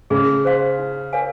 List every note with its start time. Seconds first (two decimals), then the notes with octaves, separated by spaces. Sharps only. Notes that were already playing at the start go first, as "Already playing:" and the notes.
0.10 C#3 G#4
0.45 C5 F5 C6
0.78 D#4
1.13 A#4 C#5 F5 G#5